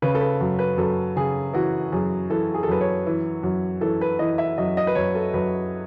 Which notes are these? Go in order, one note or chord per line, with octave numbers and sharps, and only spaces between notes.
C#3 B4
A4
B4
F#2
B4
F#2 A4
C#3 G#4
E3 F#4
F#2 G#4
E3 A4
G#4
A4
F#2 B4
C#5
E3
F#2
E3 A4
B4
E3 D#5
E5
F#2 D#5
D#5
B4
F#2 C#5
A4
F#2 B4